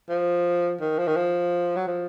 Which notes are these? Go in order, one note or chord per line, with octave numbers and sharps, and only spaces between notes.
F3
D#3
F3
D#3
F3
F#3
F3